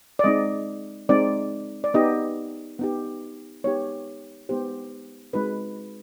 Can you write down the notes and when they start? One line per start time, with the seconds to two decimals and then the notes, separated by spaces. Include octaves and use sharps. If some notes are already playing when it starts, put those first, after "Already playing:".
0.19 D5
0.24 G#3 C4 D#4 D#5
1.09 G#3 C4 D#4 D5
1.84 D5
1.94 B3 D#4 G4 D#5
2.79 B3 D#4 G4
3.64 G#3 B3 D#4 G4 C#5
4.49 G#3 B3 D#4 G4 C5
5.33 G#3 C4 D#4 F#4 B4